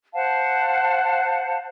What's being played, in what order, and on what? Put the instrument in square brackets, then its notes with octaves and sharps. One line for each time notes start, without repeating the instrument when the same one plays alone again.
[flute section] C5 F5 F#5 A5